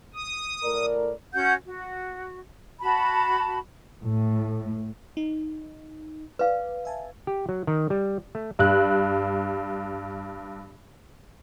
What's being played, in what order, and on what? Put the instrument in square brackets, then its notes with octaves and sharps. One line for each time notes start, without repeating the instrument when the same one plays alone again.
[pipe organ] D#6
[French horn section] A2 A#4 D5
[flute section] C#4 F#4 F#5 G6
F#4
F#4 A5 B5
[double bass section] A2
[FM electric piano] D#4
[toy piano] B4 F5 [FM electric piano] D5
[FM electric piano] E5 G#5 A5
[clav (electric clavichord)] G4
F#3
D#3
G3
A3
[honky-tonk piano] G2 F#6